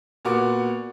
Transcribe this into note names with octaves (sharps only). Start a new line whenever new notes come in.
A#2 B3 F#4 D6